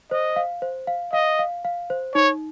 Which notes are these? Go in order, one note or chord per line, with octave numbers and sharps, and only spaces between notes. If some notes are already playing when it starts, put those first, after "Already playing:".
C5 D#5
F5
C5
F5
D#5 F5
F5
F5
C5
D#4 C#5